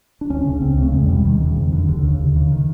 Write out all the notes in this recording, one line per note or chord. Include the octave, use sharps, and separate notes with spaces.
D4
D2 C#4
C#3
C#2 C4
C4
C#3 A3
E2 G#3
B2 G3
D#2 D#3
C#3
F2
D3
D#2 D3
C#3
D#2
C#3
D#3